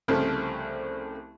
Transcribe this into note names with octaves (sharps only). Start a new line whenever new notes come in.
C2 C#3 F3 A3 C4